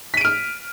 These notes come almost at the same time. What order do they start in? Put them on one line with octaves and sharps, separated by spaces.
B6 D#7 D7 F6